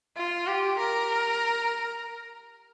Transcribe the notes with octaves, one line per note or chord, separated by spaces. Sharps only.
F4
G4
A#4